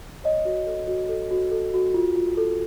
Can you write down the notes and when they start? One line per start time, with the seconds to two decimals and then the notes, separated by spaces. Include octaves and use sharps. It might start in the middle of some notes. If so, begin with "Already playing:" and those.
0.24 C#5 D#5
0.45 F#4
0.66 A4
0.88 F#4
1.09 A4
1.31 F#4
1.51 A4
1.74 F#4
1.94 F4
2.15 F4
2.37 A4